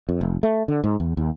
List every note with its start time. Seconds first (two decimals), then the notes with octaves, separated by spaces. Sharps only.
0.09 F2
0.21 F1
0.43 A3
0.68 D3
0.84 G#2
1.00 E2
1.17 D#2